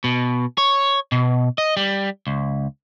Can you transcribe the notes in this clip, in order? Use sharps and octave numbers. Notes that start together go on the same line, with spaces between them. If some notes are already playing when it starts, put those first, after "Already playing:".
B2
C#5
B2
D#5
G3
C#2